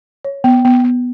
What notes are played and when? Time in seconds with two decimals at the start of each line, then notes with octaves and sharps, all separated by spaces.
0.25 C#5
0.44 B3
0.65 B3
0.84 B3